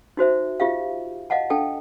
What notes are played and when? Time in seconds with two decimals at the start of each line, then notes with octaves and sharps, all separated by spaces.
0.17 D#4 F#4 C5 E5
0.60 F4 G4 E5 F5
1.30 D#5 F5 F#5 A5
1.50 D4 A4 G5 A5